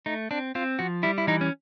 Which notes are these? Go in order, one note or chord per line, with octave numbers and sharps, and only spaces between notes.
A3 D#4
C4 D4
C4 F4
F3 F#4
G3 E4
E4
E3 D#4
C#4